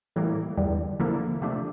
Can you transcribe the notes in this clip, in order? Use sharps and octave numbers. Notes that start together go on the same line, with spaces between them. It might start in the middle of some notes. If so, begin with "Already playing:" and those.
A2 E3 G3 A#3
E2 D3 G3
D3 F3 A#3 E4
C3 F3 A3 D4